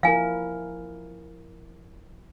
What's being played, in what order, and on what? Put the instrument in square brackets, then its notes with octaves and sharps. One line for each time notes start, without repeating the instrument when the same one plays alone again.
[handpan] F3 E4 A#4 [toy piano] F5 G#5